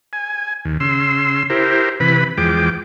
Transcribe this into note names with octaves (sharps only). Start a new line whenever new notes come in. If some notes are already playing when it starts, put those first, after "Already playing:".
G#5
D#2
C#3 C6 E6
E4 G4 A#4 C5
C3 E3 B4 B5
E2 F3 G#3 G5 D6